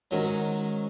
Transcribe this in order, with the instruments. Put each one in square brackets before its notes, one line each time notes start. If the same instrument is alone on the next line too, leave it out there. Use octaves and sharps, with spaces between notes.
[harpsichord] G#2 D#3 F#3 C#4